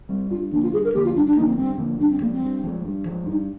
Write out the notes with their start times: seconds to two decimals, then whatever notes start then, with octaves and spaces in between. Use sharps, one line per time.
0.09 G3 C4
0.30 G2 F4
0.52 D3 F3 A#3 D4
0.62 F4
0.73 G2 G#4
0.84 A#4
0.94 D3 F3 A#3 G4
1.04 F4
1.16 G2 D4
1.26 D4
1.36 D3 F3 A#3 D#4
1.47 C4
1.58 G2 C4
1.78 D3 F3 A#3
1.99 G2 D4
2.11 C4
2.21 F3 G#3 A#3
2.32 C4
2.43 G2
2.64 F3 G#3
2.85 G2
3.05 F3 G#3
3.26 G2 D#4